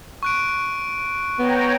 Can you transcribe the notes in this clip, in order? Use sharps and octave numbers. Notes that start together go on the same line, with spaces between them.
C#6 F#6 D7
B3 C#5 G5 A#5